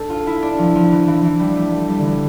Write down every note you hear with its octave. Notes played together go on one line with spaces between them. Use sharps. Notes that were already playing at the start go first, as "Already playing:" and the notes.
Already playing: D4 A4
F4
E4
D4
F3
F3
E3
E3
E3
G3
A3
A3
G3
D3
E3